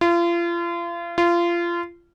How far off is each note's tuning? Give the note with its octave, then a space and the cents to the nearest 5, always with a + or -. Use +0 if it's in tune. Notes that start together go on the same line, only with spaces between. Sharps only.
F4 -35
F4 -25